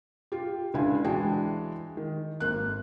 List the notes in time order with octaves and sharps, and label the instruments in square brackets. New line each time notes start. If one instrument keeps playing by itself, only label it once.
[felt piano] F4 G4
C#2 D3 D4 E4 G#5
E3 G#3 D4 F#4 G5 A5
D#3
G#1 A#3 F#6